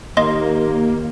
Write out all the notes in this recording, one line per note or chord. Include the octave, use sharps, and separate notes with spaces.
D#2 A#3 D#5 C6